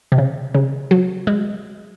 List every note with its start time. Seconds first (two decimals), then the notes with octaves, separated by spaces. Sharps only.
0.12 C3
0.18 C#3
0.54 C#3
0.91 F#3
1.27 G#3